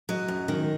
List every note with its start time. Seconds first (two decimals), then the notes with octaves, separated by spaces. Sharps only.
0.09 F#3 D#5
0.28 F#2
0.48 D#3